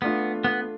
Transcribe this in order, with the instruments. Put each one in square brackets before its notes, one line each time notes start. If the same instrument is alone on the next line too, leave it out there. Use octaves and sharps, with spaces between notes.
[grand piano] A3 D4 F4 [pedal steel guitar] B3
[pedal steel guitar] B3